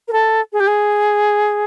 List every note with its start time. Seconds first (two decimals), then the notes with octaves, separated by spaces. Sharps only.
0.08 A#4
0.13 A4
0.53 G#4
0.60 G4
0.67 G#4